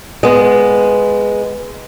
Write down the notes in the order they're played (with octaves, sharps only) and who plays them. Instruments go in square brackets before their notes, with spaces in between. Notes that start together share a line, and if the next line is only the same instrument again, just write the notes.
[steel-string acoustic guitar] G#3 B3